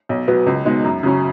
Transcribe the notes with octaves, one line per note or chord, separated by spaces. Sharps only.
B1
B2 F#3 B3
C#2
B2 G#3 D#4
F#2
C#3 F#3 C#4